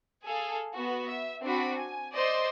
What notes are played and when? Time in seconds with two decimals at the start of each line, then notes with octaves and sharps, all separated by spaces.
0.24 G#4 A4 F5
0.74 B3 F#4
1.07 E5
1.42 C4 D4 F#4 B5
1.76 G#5
2.12 C5 D5 D#5 C6